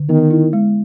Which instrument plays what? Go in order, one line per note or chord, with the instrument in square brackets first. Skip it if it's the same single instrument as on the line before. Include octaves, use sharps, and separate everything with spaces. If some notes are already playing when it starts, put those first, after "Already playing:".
Already playing: [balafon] D3
[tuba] D#3 [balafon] B3
[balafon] E4
G#3